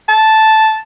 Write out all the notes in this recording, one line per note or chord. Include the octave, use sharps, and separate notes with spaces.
A5